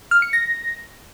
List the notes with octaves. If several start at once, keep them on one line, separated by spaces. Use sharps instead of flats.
F6
C#7
A#6